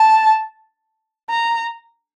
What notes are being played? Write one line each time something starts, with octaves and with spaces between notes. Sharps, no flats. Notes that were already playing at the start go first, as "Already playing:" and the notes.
Already playing: A5
A#5